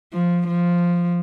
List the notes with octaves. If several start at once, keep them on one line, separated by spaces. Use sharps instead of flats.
F3
F3